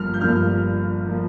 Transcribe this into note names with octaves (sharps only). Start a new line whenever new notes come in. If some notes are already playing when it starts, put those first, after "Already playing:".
Already playing: G1 G2 F3 A#3 F6
G6
G1 G2 F3 A#3 F6
F3 A#3